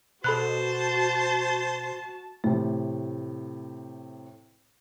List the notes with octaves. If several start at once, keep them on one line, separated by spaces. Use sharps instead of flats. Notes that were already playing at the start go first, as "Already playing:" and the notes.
B2 F#4 A4 C5 A5 B5 F#6
A2 C3 E3 A3